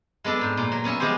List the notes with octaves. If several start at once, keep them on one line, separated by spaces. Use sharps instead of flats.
G#3 B3 D4 A4
G#2
A#2
F#3
B3 C#4 C#5 E5
F3 G#3 B3 G4 C5